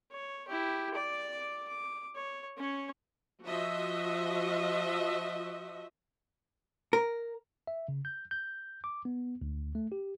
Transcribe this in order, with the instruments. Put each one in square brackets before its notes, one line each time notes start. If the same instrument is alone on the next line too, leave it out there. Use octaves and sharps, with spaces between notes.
[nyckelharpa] C#5
E4 G4
D5 D6
D6
C#5
C#4 C#5
[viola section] F3 F#4 D#5 E5
[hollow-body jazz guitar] A#4
[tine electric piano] E5
C#3
G6
G6
D6
B3
D2
A3
G4